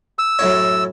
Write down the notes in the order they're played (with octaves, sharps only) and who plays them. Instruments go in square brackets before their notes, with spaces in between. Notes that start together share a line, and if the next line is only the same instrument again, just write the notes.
[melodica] E6
[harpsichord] F#2 A2 C#5